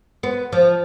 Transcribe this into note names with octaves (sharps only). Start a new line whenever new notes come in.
B3
F3